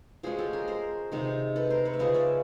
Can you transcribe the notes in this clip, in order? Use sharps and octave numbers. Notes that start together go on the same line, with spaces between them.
F3 G#3 C#4 F#4 G#4
G4 A4
G#4 A#4
A#4 C5
C3 D#3 G#3
A4 B4
A#4 C5
B4 C#5
E5
C#3 F3 G#3 C#4 C#5 D#5
D5 E5